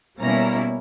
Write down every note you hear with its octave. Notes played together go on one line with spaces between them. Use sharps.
B2 G3 A#3 C#4 E4 A#5